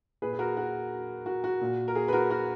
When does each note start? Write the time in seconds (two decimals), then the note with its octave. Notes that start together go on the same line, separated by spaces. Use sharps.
0.22 A#2 G#4 B4
0.33 G#4
0.39 F#4 A#4
0.57 F#4
1.26 F#4
1.44 F#4
1.61 A#2
1.88 A#4
1.95 G#4
2.08 B4
2.13 F#4 A#4
2.30 F#4 A#4